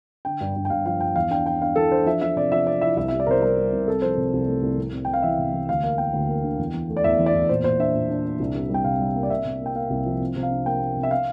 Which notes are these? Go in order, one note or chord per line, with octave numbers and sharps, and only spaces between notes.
D3 G5
G2
G2
G5
G2 F5
F3 F5
G2 G5
E2 F5
D4 G5
D4 G5
D4 F5
E3 A4
D4 C5
F3 E5
F3 E5
C3 D5
F3 E5
C4 D5
E4 E5
C2 E5
G3 E5
D5
C3 A#4 C5
G3 A#4
G3
C2
C3 A4
F3 C5
C3
C2
A3
C2
C3
C3
C3 G5
F5
E3 E5
C3
E3
D2 F5
A#3 F5
A#3 G5
D2
A#3
D3
E2
E3
A3
D5
E2 E5
E3
D5
E2
A#2 C5
A#2 C5
D4 E5
A#2
D4
D4
C2
G3
G3 G5
C3 F5
G3
A#3
D5
C3 E5
C3
A#3 G5
A#3 F5
C2
F3
C3
C3
F5
D4
A#3 G5
A#3
C3
E5
F5